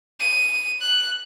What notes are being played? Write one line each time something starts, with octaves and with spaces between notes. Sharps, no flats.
D#7
F#6